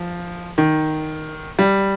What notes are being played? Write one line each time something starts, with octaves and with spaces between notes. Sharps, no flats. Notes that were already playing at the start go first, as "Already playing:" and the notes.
Already playing: F3
D#3
G3